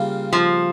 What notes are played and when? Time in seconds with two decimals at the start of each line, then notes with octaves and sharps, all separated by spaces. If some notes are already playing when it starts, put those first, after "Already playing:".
Already playing: C#3 G3 A#3 F4
0.33 F3